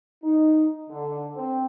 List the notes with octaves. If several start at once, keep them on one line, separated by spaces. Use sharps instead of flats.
D#4
D3
C4